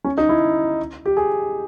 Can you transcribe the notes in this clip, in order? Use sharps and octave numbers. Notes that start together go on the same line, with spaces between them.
C#4
D#4
E4
G4
G#4